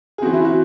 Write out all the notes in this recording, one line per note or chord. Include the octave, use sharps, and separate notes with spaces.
G#4
E3 C4 F#4
E4
F#4